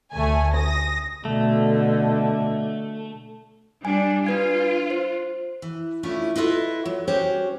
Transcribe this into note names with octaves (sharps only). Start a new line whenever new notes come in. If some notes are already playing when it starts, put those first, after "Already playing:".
D2 A3 G#5
D#6 A#6
B2 D3 A3
G3 D4 G#5
D4 F4 B4 G#6
C5
E3
A3 C#4 D4 E4 F4
E4 F4 A4 B4 D#5
F#3
G3 C#4 F#4 G4 C5 C#5